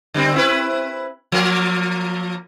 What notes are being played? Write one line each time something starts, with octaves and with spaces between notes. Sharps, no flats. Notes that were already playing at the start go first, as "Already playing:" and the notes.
D3 G3 C4
C4 E4 B4
F3 A#3 A#4